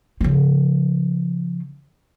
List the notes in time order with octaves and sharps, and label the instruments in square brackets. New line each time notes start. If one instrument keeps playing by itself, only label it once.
[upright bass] C#3 F3